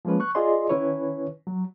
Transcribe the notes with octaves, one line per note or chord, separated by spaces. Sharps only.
F3 G#3 A#3 C#4 B4
C#6 F#6
F4 G#4 D5 D#5 C6
D#3 C#4 E4 B4 C#5
F#3